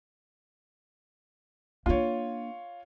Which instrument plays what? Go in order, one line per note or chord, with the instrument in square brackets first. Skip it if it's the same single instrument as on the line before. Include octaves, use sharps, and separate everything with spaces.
[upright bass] A#3 D4 [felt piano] F4 C#5